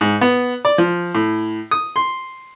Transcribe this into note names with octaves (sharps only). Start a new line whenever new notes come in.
G#2
B3
D5
F3
A2
D#6
C6